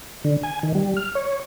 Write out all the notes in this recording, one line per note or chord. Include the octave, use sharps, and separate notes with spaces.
D3
G#5
D#3
G3
F6
C#5